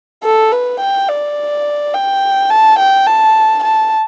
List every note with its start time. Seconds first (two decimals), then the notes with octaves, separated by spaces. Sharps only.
0.23 A4
0.52 B4
0.80 G5
1.09 D5
1.94 G5
2.50 A5
2.79 G5
3.07 A5
3.64 A5